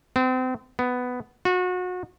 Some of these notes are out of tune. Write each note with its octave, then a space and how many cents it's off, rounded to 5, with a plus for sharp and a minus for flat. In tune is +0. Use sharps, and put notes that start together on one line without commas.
C4 -35
B3 +10
F#4 -30